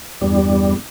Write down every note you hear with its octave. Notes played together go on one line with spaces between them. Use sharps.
E2 G2 G3